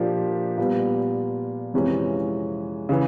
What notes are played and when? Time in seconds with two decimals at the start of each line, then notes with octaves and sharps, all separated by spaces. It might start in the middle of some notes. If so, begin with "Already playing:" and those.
Already playing: A#2 F3 A#3 D4 G4
0.58 A#2 G3 B3
1.73 F2 C3 E3 G#3 C#4
2.89 C#3 E3